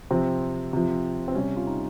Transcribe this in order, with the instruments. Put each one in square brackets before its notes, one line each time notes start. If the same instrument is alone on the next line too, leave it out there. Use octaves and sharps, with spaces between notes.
[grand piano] C3 F3 C4
C3 F3
C4
C3 G3 C#4
F4
D#4